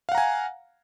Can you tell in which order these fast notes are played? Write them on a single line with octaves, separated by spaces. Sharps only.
F5 F#5 A#5 G#5